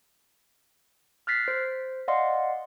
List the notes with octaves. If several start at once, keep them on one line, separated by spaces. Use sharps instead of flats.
F6 F#6 A6 B6 C7
C5
D5 D#5 F5 F#5 C6